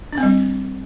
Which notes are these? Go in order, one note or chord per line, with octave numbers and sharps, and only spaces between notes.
D4
C4
G3